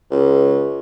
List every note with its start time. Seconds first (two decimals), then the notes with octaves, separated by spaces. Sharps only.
0.11 C#2